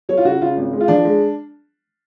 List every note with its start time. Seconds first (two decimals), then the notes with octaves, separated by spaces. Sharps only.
0.09 F#3 C#5
0.18 F4
0.25 C#3 F#4
0.42 C#3 F4
0.57 G#1
0.73 G#3
0.81 F4
0.88 F3 D4
1.05 G#3